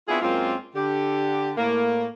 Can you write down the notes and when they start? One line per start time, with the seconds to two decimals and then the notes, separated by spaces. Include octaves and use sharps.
0.09 B3 C4 D4 E4 F4 G#4
0.22 F#2 G#3 A#3 C4 F4
0.75 D3 G4
1.58 A2 A#3